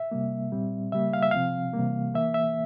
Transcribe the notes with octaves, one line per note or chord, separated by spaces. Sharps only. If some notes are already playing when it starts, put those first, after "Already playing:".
Already playing: E5
C3 G3 A#3
A#2 G3 C4
C#3 G3 A#3 E5
F5
E5
C3 F3 C4 F5
C3 E3 G3 A#3
E3 A#3 E5
E5